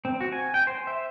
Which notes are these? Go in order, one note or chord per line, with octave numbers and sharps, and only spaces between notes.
C4
F#4
G#5
G5
C5
E5